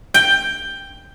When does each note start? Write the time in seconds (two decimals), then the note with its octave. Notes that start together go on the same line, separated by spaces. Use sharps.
0.14 G5